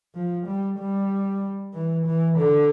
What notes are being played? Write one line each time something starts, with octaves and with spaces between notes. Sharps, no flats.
F3
G3
G3
E3
E3
D3